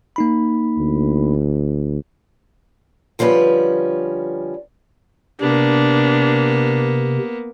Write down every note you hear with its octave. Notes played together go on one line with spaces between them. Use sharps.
A#3 D#4 B5
D2
D3 F3 G3 C#4 B4
C3 A#3 B3 D4